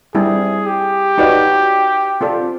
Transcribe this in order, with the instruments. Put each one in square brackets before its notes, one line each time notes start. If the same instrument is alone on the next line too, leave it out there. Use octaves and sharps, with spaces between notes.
[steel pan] G3 C4 E4 [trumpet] G#4
[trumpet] G4
[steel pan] D#4 F#4 B4 D5 G5
C4 F4 A4 D5